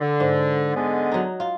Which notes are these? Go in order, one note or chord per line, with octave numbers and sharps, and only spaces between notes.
D3
G#2
D3 G#3 B3
F#3 D#4
F4